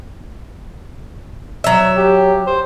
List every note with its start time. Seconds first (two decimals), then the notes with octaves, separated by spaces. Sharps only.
1.64 F#3 E5
1.96 G4
2.47 C5